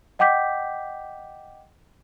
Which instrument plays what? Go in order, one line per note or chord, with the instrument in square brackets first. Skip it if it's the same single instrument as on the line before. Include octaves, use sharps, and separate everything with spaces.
[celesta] D#5 F#5 G5 D6 G6 B6